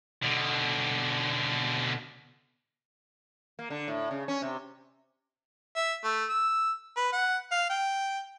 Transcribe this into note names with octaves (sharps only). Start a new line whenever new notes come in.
B2 D3
A#3
D3
A2
C#3
C#4
C3
E5
A3
E6
B4
F#5
F5
G5